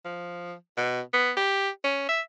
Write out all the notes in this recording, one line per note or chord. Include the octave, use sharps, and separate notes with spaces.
F3
B2
B3
G4
C#4
E5